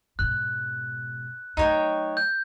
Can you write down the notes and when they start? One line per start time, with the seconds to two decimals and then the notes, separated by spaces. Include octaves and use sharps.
0.19 G#2 B2 F#6
1.57 F#3 A3 D#4 C#5 G5
2.17 G6